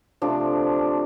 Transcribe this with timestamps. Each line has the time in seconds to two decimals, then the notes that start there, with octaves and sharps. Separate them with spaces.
0.22 C3 F3 A3 D4